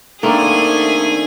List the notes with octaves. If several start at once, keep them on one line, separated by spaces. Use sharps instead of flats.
D#3 A3 A#3 C4 D4 G#4 G#5